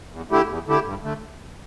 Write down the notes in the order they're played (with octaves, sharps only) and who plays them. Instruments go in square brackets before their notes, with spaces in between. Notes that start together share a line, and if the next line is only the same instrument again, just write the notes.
[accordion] E2
D3 A3 E4 G4
E2
D3 A3 E4 G4
G2
D3 A3